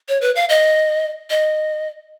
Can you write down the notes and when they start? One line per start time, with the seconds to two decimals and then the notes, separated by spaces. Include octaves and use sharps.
0.09 C#5
0.21 B4
0.36 F5
0.49 D#5
1.30 D#5